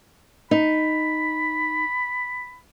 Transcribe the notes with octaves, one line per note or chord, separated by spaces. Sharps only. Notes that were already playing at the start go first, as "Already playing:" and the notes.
D#4 B5